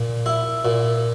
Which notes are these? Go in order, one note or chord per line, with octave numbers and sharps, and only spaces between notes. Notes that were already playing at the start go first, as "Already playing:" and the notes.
Already playing: A#2
E4
A#2